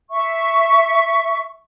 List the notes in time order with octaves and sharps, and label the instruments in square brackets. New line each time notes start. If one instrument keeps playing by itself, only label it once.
[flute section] E5 C#6